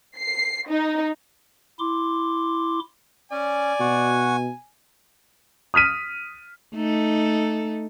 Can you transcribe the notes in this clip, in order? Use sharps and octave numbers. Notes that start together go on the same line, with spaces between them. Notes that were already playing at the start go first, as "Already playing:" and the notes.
C7
D#4
E4 C6 D6
C#4 D5 G#5
B2 F#4 F#5
D#6 F6 B6 D#7
A3 D#4 A4